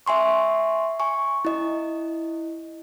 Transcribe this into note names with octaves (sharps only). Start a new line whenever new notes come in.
E5 G#5 C6 C#6
G#5 C#6
E4 D#5